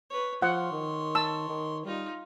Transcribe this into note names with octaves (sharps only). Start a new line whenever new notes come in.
B4 C#5
F3 C#5 F#5 C6
D#3
A5 E6
D#3
G3 D#4 F4